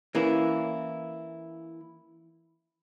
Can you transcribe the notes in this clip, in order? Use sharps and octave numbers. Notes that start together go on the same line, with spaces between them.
E3 A#3 C#4 E4